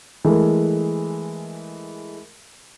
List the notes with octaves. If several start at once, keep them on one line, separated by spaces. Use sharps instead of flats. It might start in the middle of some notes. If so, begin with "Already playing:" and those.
E3 G#3 A3 A#4